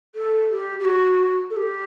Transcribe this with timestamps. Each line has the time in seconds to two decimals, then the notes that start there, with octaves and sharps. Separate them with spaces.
0.15 A4
0.50 G4
0.80 G4
0.85 F#4
1.50 A4
1.57 G4